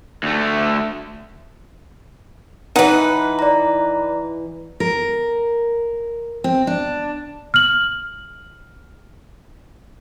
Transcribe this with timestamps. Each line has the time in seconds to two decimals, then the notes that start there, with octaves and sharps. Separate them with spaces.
0.23 D2 A3
2.76 E3 D#4 B4 F#5
3.39 D5 A#5
4.80 A#4
6.44 C4
6.67 D4
7.54 F6 F#7